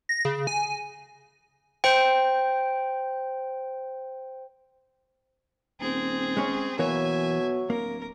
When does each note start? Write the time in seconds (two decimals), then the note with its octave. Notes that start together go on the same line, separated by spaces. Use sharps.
0.09 A#6
0.25 C#3
0.47 G#5
1.84 C5 G5
5.81 D#1 C4 G#4
6.37 G#3 C#4
6.79 B2 E3 F#3 A#3 C#5 E5 G#5
7.70 D1 A#3 A#4